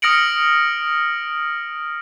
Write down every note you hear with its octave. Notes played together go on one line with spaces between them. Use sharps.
D#6 F6 A#6 C#7 D7 F#7